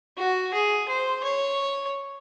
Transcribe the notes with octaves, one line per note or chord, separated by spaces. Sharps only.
F#4
G#4
C5
C#5